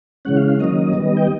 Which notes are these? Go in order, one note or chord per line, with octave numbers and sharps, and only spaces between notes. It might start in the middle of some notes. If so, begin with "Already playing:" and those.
C#3 E3 G#3 C#4 F#5
F5
F5
D#3 F#3 A#3 C#4 D#5
D#3 G3 B3
G5